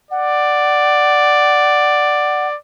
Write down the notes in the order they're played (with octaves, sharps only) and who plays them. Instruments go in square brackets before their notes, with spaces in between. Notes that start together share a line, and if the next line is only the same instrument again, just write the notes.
[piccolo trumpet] D5 [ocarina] F#5